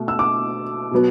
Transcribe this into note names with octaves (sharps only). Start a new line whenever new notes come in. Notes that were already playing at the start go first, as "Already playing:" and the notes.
Already playing: B2 A3
E6
D6
B2 F#3 B3